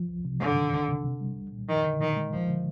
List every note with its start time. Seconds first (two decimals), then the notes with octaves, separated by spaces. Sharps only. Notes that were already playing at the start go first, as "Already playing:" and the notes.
Already playing: F3
0.09 C2
0.25 C3
0.40 G2 D3
0.57 D#3
0.73 C2
0.88 C3
1.04 C3
1.20 G3
1.36 C2
1.52 A#2
1.69 F2 D#3
1.85 D3
2.00 A#2 D#3
2.16 G#3
2.32 D2 F3
2.49 D3